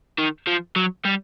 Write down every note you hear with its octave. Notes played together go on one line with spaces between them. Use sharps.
D#3
F3
F#3
G3